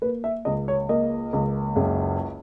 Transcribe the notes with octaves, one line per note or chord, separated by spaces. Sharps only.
A#3 B4
E5
C#2 D#5
C#5
A#3 D#5
C#2
F#1